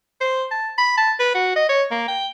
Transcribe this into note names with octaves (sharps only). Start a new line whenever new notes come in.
C5
A5
B5
A5
B4
F#4
D#5
C#5
A#3
G5